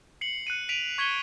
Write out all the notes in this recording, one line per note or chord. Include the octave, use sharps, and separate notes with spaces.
C7 C#7 F#7
F#6 C#7 D#7
B6 D7 D#7 F7
C#6 G#6 B6 C#7 D#7 G7